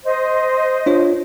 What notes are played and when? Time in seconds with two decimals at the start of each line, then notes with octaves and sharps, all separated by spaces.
0.04 C5 D#5
0.86 D4 F4 C#5